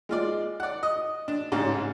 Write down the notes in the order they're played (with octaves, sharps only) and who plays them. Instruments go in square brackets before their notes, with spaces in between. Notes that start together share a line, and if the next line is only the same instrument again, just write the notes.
[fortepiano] G#3 F4 D5
D5 F#5
D#5
D4
A1 G#2 C#3 C#4 D4